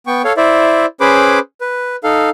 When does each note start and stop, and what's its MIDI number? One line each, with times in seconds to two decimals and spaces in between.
0.07 0.22 59
0.07 0.22 79
0.07 0.22 85
0.25 0.33 69
0.25 0.33 73
0.25 0.33 77
0.37 0.86 64
0.37 0.86 72
0.37 0.86 74
0.37 0.86 76
1.00 1.39 61
1.00 1.39 68
1.00 1.39 71
1.00 1.39 72
1.00 1.39 83
1.00 1.39 86
1.61 1.96 71
2.04 2.30 63
2.04 2.30 69
2.04 2.30 77